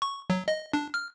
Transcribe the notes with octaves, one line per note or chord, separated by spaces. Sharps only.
C#6
F#3
D#5
D4
F6